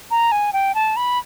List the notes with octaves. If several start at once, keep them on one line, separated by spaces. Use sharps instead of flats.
A#5
G#5
G5
A5
B5